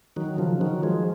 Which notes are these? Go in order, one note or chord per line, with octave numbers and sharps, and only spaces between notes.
D#3 F#3
C#3 F3
D#3 F#3
F3 G#3